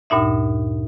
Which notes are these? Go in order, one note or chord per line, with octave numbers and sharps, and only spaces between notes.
D2 G2 A#2 D#4 E5